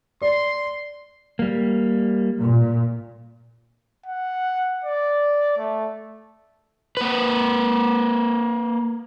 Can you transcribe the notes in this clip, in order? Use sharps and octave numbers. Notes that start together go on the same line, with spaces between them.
D5 C6
G3 A#3
A#2
F#5
D5
A3
A#3 B4